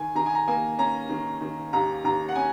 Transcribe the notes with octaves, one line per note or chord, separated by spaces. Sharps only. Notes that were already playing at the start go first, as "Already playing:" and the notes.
Already playing: D#3 G#5
D#3 A#5
G#5
A#5
A#3 G#5
C#4 A#5
D#3
D#3
D#2 A#5
D#2 A#5
F#5
C#4 G#5